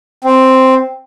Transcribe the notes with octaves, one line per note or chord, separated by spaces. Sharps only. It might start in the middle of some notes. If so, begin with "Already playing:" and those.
C4